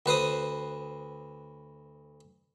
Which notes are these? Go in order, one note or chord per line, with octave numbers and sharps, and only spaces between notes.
D2 B4 C5 D#6